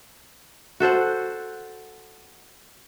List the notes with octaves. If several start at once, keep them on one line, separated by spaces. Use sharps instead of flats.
F#4 A4 C5 F#5